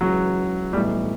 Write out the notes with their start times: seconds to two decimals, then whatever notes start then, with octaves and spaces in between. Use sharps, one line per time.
0.01 C#2 C#3 E3 F#3
0.73 B1 A2 E3 G3